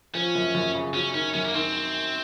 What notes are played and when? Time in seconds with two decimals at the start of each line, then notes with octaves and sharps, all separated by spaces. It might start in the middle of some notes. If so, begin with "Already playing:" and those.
0.15 F3 C#4
0.35 F#2
0.55 F#2
0.75 C#3
0.94 F#3 C#4
1.14 D#3 C#4
1.34 F#2 C#4
1.44 A#3
1.54 D#3 C4